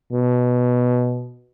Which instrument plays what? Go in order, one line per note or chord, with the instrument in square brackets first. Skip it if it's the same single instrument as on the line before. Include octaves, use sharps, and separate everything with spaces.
[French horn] B2